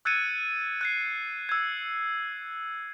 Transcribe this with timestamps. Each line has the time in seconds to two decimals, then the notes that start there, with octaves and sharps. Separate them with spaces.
0.05 E6 F#6 G#6 A6 C#7 D#7
0.81 F#6 G#6 C7
1.49 E6 G#6